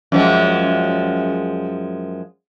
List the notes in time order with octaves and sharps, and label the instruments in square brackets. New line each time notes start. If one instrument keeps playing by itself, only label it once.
[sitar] F#2 F3 G#3